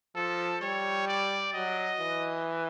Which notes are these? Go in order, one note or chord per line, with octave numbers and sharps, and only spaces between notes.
F3 A4
G3 C#5
D5
F#3 D#5
E3